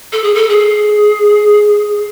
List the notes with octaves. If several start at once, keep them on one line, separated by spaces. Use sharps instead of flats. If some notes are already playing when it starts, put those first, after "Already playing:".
A4
G#4
A4
G#4